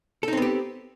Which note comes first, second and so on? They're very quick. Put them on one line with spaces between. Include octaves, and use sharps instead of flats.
A4 D#4 C4 B3 G4